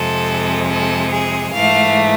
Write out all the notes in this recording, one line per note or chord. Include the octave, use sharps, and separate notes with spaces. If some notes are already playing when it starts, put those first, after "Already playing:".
Already playing: F2 C3 G#3 A4
A4
G#4
G#2 E3 A3 F5